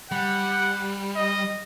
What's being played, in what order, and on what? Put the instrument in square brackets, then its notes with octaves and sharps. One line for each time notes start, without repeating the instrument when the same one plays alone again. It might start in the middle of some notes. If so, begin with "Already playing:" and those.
[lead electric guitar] G3 [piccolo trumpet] F#5
[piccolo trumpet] D#5